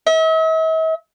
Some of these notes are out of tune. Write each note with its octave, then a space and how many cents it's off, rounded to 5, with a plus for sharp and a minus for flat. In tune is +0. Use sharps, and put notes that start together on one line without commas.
E5 -45